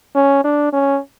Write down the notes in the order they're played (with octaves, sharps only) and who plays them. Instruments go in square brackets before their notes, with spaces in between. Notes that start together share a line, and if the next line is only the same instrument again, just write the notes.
[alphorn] C#4
D4
C#4